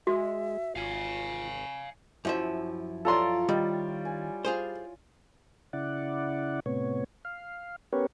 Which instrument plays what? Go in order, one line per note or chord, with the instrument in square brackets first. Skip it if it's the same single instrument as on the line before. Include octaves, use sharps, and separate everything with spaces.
[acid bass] G#3 [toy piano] F#4 [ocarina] E5
[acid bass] G#1 [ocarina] F4 [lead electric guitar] F5 G#5
[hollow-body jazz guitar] F#2 F3 E5 [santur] E4
[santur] F4 C#5 D5 [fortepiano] A4 A#5 C6
[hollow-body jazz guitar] D#3 [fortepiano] G3
[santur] G#5
[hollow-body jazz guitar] F4 G#4 C5
[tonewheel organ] C#3 E4 D5 F#5
A2 C3 B3 C#5
F5
B3 C#4 G4 A#4 B4 C#5